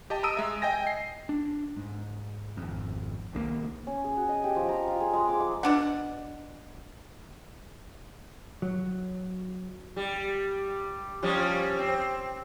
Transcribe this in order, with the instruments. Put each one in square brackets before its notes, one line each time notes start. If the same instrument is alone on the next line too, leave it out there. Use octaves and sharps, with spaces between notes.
[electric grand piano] G4 D#5 A5
A5 A#5 D#6 E6 D7 D#7
G#3 E5
D#5 G5 G#5 A#6
C7
[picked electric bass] D4
G#2
G#1 F2
B1 D#3 G3 A#3
[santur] C#4
G#4
F#4
D#5
G4
F3
A#5
F4
G#4
G#3
D6
D6
[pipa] B2 D4 F#5
[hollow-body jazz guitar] F#3
[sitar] G3
F3 G3 C#4
C4